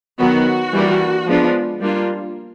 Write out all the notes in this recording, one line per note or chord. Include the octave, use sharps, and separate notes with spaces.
D#3 F#3 B3 F#4
E3 G3 A#3 D4
F3 G#3 B3 D4 F4
G3 A#3 D4 F4